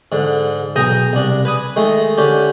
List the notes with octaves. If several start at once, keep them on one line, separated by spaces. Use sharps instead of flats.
G#2 D3
B1 G#4 G5 A#5 D#6
C2 D4
B4 G#5 D#6
D#3 G#3 A3
D3 C#4 G4